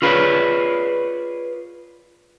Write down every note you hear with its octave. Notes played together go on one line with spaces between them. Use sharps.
F4 G#4 B4 C#5 D5